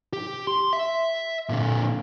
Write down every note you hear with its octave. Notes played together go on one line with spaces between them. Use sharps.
G4
C6
E5
A#2 D3